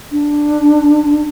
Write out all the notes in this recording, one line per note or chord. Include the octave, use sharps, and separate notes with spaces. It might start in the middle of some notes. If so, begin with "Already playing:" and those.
D4